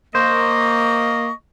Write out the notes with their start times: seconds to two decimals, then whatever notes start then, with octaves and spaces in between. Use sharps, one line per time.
0.15 A#3 C5 D#5 C#6